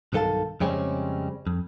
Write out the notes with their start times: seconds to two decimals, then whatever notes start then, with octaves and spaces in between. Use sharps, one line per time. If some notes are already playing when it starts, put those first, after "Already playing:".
0.13 B1 G2 D#3 A4 F5 A5
0.60 F2 C#3 G3 G#3 C4 C#4
1.47 F2